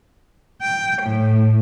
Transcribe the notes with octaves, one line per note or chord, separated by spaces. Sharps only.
G5
A2